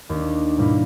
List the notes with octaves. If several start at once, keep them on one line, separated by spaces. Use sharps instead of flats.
D#2 D4
G#2 B2 G3 A#3 E4